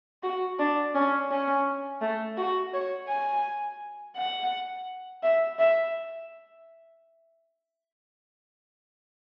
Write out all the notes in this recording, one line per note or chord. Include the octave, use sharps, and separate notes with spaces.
F#4
D4
C#4
C#4
A3
F#4
C#5
G#5
F#5
E5
E5